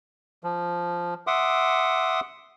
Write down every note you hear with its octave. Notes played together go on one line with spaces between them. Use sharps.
F3
E5 F#5 C6 D6 D#6